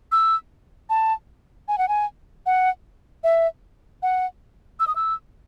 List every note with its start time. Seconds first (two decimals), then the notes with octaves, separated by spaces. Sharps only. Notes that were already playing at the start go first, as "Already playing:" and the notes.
0.12 E6
0.90 A5
1.68 G#5
1.78 F#5
1.88 G#5
2.46 F#5
3.24 E5
4.03 F#5
4.80 E6
4.87 D#6
4.96 E6